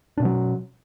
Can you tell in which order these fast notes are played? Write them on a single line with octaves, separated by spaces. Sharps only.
D4 B2 C#4 F#3